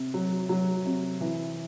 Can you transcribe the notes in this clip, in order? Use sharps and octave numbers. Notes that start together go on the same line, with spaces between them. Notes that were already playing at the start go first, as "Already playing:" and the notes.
Already playing: C3
F#3
F#3
C3
E3